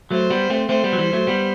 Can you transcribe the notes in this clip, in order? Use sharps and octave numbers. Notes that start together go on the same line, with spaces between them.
F#3 A3 C5
G3 B3
A3 C4
A3 C4 C5
G3 B3
F#3
E3 G3
F#3 A3
G3 B3